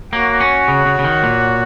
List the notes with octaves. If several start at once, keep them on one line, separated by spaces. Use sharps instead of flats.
A#3 F#4 C#5 F#5
C#4
C#3
C#3
C#3
D#3
A#2